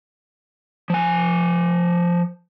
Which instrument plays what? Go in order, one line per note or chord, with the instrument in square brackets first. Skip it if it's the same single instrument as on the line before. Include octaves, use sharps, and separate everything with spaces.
[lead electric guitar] F3 G#5